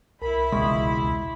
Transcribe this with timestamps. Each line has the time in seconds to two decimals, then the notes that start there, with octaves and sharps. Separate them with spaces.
0.22 C2 E4 A#4 B5
0.52 E1 C#2 G#3 C6 C#6 D#6